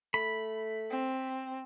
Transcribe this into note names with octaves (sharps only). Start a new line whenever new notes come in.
A3 B5
C4